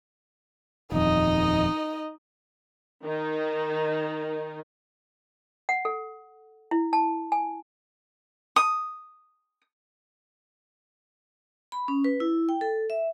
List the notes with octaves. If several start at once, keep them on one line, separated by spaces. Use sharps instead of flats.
D#1 F2 D#4 D#5
D#3 D#4
F#5
A4
E4
A5
G#5
D#6
B5
C#4
B4
E4
G5
A4
E5